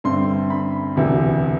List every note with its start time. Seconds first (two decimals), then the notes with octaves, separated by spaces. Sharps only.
0.04 G2 D3 A3 C4 C6
0.50 B5
0.96 E1 D2 C3 E3